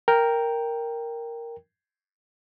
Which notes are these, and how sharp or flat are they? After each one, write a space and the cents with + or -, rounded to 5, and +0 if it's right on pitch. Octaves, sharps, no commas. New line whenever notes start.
A#4 +0 G5 +5